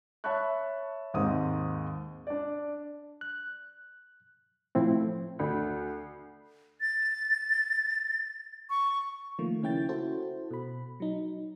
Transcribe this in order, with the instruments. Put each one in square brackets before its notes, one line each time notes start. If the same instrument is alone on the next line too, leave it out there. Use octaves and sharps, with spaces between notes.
[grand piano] C#5 E5 A5 B5 C#6 F#6
D#2 G#2 C4 D#6
D4 D5
[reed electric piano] F#6
A2 F3 C4 E4
[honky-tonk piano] D2
[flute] A6
C#6
[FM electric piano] D#3 F3 A3 A#3
C#3 C#4 E4 G5 G6 A6
E4 F#4 A4 C5
B2 B5
F#3 D#4